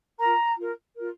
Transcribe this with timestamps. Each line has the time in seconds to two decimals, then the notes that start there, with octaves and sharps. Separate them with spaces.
0.19 F4 A#4 A#5
0.56 F4 A#4
0.94 F4 A#4